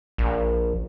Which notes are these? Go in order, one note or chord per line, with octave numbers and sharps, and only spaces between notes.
A#1